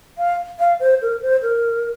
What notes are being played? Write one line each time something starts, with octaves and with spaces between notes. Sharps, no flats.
F5
F5
C5
A#4
C5
A#4